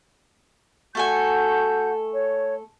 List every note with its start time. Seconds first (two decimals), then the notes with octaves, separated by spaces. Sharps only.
0.95 A3 F#4 A4 F#5 G#5 G6
2.12 C#5